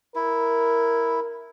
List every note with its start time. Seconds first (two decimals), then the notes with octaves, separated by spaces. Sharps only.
0.15 E4 A#4